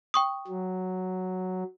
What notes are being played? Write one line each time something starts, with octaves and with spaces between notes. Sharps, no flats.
G5 C#6 D#6
F#3